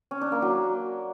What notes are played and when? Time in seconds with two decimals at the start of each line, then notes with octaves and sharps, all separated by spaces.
0.11 C#4
0.21 D4
0.32 A#3
0.42 F#3